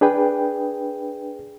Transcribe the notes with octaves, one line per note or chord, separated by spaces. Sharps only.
D4 G#4 B4 G5